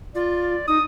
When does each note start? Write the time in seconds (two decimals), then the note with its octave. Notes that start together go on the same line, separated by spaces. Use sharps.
0.15 F4 D5
0.68 D#4 D#6